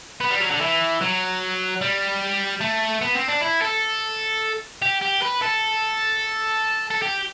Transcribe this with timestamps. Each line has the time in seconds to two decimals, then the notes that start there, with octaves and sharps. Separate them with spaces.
0.21 B3
0.31 G3
0.40 F#3
0.51 D3
0.61 E3
1.01 F#3
1.81 G3
2.61 A3
3.01 B3
3.15 C4
3.28 D4
3.41 E4
3.61 A4
4.82 G4
5.01 G4
5.22 B4
5.42 A4
6.90 A4
7.02 G4